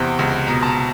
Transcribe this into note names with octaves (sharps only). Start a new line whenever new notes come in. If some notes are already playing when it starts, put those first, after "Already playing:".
Already playing: E2 C3
C#2
B2 A#5
A5
A#5